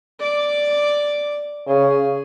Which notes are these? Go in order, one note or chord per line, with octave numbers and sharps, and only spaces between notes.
D5 D6
C#3 G#4